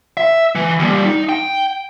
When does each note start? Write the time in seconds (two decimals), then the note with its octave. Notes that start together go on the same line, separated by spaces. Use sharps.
0.17 E5
0.55 E3
0.79 D#2 G3
1.06 D#4
1.29 G5